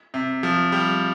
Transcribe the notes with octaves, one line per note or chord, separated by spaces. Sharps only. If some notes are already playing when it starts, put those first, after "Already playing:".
C3
F3
G3